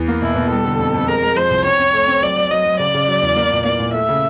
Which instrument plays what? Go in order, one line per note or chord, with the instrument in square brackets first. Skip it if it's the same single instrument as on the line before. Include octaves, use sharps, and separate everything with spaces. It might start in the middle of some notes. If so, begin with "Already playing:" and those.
Already playing: [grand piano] E2
A#3
[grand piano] B2 [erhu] E4
[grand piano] B2
[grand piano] G3 [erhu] A4
[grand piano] D3
F2
F2
[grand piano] G#3 [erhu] A#4
[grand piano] G#3
[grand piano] F3 [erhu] C5
[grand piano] C2
[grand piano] C4 [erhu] C#5
[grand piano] C4
A3
C4
[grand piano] F#3 [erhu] D5
[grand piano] F#3
[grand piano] F#3 [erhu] D#5
[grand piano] F#3
[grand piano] C#3 [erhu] D5
[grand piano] C#3
F#3
E2
A#3
A#2
[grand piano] A#3 [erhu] D5
[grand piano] A#2
[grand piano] A3 [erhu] E5
[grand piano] C#3